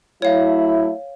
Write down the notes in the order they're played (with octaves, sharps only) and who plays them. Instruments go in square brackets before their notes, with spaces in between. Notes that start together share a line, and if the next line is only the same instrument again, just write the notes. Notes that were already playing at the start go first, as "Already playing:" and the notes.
[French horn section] F#3 A3 E4 [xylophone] C#5 F5